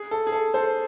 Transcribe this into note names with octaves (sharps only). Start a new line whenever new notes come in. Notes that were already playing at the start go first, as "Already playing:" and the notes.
Already playing: G#4
A4
G#4
A4
A4 C5